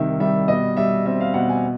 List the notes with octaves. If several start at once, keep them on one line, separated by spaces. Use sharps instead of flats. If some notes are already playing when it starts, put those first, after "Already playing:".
Already playing: C2 C3 D#3 E5
G3 E5
B2 D#5
G3 E5
C4 E5
F5
B2 F#5
G#5